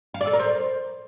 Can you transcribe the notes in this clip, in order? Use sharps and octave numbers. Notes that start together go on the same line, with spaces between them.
F5
D5
A4
A#4
C5